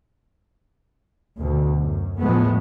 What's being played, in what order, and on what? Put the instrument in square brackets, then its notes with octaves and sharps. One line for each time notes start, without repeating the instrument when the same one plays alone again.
[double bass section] D2 B2
F#2
E2 A2 F3 G#3 A3 B3